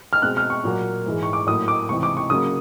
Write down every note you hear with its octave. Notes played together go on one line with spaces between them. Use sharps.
F6
B2 G#3 C4 F#6
F6
C#6
A#2 F#3 A#3
G#2 E3 G#3
C#6
D6
A2 F#3 A#3 D#6
D6
C#2 C3 E3 C#6
D6
C#6
C#3 F#3 A#3 D#6